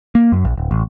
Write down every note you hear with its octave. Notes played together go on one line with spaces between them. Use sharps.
A#3
F#2
A#1
D1
A1